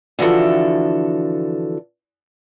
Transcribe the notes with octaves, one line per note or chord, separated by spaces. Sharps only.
D3 E3 F3 F#4 A4